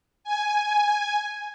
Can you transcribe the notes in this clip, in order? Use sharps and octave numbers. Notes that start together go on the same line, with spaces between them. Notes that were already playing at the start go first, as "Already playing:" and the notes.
G#5